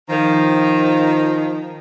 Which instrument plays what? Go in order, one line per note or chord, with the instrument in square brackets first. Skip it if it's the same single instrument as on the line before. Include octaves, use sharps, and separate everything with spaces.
[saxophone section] D#3 F3